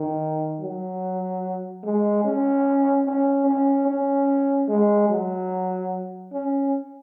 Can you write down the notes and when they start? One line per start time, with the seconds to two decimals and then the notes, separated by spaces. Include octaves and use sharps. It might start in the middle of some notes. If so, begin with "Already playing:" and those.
Already playing: D#3
0.61 F#3
1.83 G#3
2.24 C#4
3.05 C#4
3.46 C#4
3.87 C#4
4.68 G#3
5.09 F#3
6.33 C#4